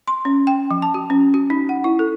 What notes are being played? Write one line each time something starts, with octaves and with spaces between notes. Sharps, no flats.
C6
C#4
G5
F3
A5
F#4
C#4
F#4
D#4
F#5
E4
A4